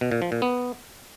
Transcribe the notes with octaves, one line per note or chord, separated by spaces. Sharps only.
B2
A#2
F3
A#2
B3